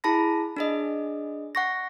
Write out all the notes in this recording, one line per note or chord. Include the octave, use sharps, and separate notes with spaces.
E4 G#4 A5 B5 A#6
D4 G#4 D#5
F#5 C#6 A#6